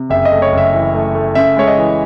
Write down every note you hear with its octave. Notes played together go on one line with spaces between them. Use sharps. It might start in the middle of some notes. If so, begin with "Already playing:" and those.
Already playing: C3
F#1 E5
D#5
A3
C#5
F#1
E5
E3
A3
A3
C#3 E5
G#3 C#5
D#5
E3